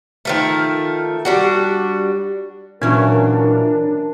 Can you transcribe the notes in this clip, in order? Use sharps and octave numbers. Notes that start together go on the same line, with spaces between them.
D#3 F3 A3
G3 D4 F#4
A#2 E3 F#3 C#4 D4 A#4